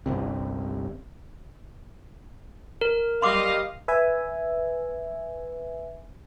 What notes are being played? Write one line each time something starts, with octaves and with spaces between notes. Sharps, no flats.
G1 C2 C3
A#4
G3 D#5 F5 C6 D6
B4 E5 G#5